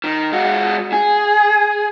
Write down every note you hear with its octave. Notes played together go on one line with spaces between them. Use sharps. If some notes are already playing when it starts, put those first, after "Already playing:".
D#3
G#3 F#4
G#4